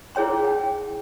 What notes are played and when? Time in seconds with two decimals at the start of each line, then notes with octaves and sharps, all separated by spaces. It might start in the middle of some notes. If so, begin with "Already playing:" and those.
0.15 E4 G#4 C#5 G5 C6
0.45 G5